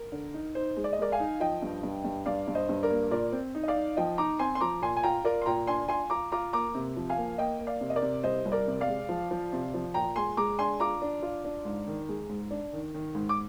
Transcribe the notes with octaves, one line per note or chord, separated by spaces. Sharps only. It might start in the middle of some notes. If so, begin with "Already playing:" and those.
Already playing: A#4
D3
D#4
D#4 C5
G#3
D5
D#5
G#3 A#4 D5
F5 G#5
D#4
F3 D#5 G5
G2
G2
G2
G2 D5 F5
G2
C5 D#5
G2
A#4 D5
A#3
A#2 A#4 D5
C4
D#4
D#5
D5 F5
D#4
F3 D#5 G5
D#4 A#5 D6
C4 G#5 C6
C6
F3 A#5 D6
A#2 G#5 C6
G#5
F4 G5 A#5
F4 A#4 D5
C6
A#2 G5 A#5
D4 G#5 C6
F4 G#5 C6
F4 A#5 D6
F4 A#5 D6
A#3 A#5 D6
C3
F3
F5 G#5
A#3
A#3 D#5 G5
A#3
D5 F5
C3
D#5
A#4 D5
C3
C2 C5 D#5
C2
A#4 D5
C3
D5 F5
G#3
F3
F3
C3
F3
A#2 G5 A#5
G#3 G#5 C6
G#3 A#5 D6
D4 G#5 C6
F4 A#5 D6
D4
F4
D4
G#2
D#3
G#3
G#2
D4
D#3
D#3
G#2
D6